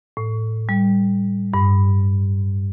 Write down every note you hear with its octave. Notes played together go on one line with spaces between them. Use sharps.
A2
G3
G2